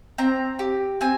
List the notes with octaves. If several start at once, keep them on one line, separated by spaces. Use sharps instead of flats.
C4 A#5
G4
C4 G#5